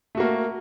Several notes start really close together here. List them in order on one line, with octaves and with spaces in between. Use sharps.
A3 F#4 A#3